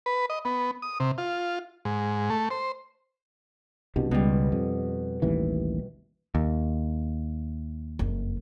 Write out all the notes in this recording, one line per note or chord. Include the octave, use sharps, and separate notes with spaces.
B4
D#5
B3
D#6
C3
F4
G#2
A3
C5
C2 G2 B2
C#2 B2 G3
F2
A1 D#2 E3
D#2
F#1 F2